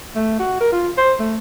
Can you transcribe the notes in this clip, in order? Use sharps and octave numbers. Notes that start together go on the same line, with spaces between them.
A3
F#4
A#4
F4
C5
A3